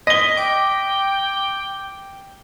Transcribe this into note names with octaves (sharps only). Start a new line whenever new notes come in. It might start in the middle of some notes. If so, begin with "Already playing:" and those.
D#5 A#6 B6 G7
G5 D6